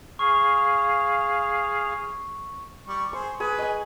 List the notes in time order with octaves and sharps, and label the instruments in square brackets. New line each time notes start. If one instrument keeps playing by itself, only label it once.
[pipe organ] G#4 F5 [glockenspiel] C#6
[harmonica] G3 C#6
[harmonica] G#4 C5 [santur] C#6
[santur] G#4 [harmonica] B4
[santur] D#5 G#5